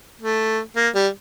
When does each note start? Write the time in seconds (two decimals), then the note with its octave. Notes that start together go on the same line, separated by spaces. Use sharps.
0.21 A3
0.76 A#3
0.95 G3